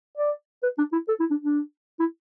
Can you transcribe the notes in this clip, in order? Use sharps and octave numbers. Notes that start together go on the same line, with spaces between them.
D5
B4
D4
E4
A4
E4
D4
D4
E4